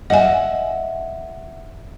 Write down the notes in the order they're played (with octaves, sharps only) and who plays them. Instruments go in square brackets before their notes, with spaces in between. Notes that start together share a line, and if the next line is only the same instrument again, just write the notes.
[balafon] D#5 G#5 [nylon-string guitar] E5 F#5